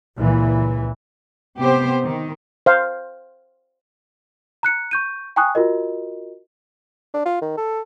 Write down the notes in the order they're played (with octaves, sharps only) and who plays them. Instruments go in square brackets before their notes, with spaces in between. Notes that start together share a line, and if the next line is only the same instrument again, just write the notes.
[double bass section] C#2 A#2 E3
[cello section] C3 B3 G4 C5
D#3
[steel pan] C5 F5
[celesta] A#5 F#6 C#7
C#6 G6 D#7
G5 G#5 A#5 C#6 D#6 F#6
F4 F#4 A#4 D#5
[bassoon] D4
F4
D#3
A4